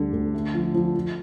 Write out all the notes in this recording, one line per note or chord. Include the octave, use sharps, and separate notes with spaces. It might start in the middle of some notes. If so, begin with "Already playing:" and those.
Already playing: D2 D3 G3
D2
A3
F3
F3
F3